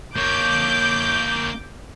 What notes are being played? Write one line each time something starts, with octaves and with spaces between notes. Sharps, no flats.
A#3 C#5 D6 G6